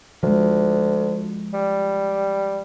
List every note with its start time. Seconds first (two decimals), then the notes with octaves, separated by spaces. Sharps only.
0.23 D2 F3 G#3
1.53 G3